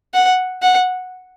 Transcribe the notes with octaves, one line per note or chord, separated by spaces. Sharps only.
F#5
F#5